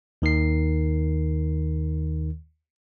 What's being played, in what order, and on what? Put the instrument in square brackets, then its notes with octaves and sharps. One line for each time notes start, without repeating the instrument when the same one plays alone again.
[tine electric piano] D#2 D#3 A#4 C7